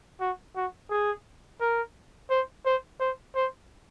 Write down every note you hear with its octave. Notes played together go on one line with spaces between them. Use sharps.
F#4
F#4
G#4
A#4
C5
C5
C5
C5